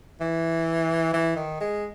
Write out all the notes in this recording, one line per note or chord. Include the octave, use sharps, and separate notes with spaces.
E3
E3
D#3
G#3